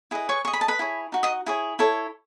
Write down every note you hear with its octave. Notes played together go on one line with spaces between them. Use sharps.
E4 G#4 B4 D#5
C#5 C#6
G#4 D#5 C#6
B5
A5
B4 B5
E4 G#4 C#5
D#4 F#4
D#5 D#6
E4 G#4 C#5
E4 A4 C#5